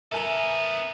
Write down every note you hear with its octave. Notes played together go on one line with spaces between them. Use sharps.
B3 A4 A#4 E5 G#5 A#5